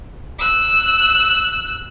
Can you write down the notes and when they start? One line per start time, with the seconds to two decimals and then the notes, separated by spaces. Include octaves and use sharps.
0.39 E6 F#6